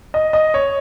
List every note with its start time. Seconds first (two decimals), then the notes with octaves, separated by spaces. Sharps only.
0.14 D#5
0.33 D#5
0.54 C#5